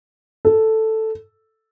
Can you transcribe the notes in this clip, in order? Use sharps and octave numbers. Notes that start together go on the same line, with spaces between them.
A4